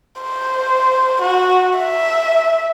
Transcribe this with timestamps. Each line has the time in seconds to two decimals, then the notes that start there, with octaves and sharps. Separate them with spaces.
0.22 C5
1.22 F#4
1.78 E5